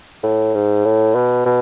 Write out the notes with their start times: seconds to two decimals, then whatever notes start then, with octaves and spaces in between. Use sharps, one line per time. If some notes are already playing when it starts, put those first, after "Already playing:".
0.23 A2
0.54 G#2
0.85 A2
1.15 B2
1.46 B2